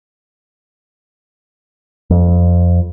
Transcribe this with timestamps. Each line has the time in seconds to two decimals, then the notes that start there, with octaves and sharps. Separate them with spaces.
2.10 F2